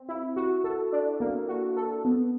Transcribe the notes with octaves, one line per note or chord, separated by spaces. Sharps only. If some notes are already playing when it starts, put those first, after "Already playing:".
Already playing: C4
E4
F#4
A4
D4
A#3
F#4
A4
B3